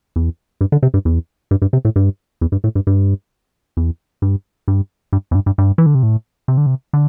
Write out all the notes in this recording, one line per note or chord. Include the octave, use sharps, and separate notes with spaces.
E2
G2
D3
C3
G2
E2
G2
G2
C3
A2
G2
E2
G2
A2
G2
G2
E2
G2
G2
G2
E2
G2
G2
G2
E3
D3
C3
A2
C3
D3
C3
D3